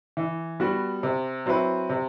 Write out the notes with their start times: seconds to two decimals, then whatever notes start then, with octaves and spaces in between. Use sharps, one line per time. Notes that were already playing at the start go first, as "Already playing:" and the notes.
0.17 E3
0.60 G3 B3 F#4
1.03 C3
1.46 F#3 C4 E4 B4
1.90 C3